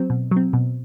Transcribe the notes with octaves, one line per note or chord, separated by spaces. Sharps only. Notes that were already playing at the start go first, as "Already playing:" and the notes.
Already playing: F#3 C4
B2
F#3
C4
B2